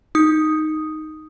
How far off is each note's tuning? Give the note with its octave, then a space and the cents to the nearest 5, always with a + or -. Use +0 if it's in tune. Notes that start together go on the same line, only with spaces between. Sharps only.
D#4 +0 D#6 +0